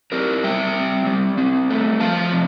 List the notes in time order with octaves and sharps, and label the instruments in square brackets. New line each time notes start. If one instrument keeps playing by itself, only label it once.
[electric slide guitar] C4 G4 A#4
G3 E5 G5
C4
G3
C4
A3
F3 F5 A5
C3